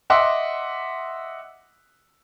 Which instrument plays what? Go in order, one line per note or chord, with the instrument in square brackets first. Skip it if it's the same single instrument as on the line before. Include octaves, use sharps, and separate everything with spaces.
[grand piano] D#5 E5 F#5 C6 D6